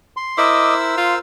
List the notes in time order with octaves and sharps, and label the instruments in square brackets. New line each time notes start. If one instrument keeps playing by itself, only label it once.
[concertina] C6
[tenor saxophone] E4 [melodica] A#4 C5 E6 [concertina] D#5 D6
[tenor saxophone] F4 [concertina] F5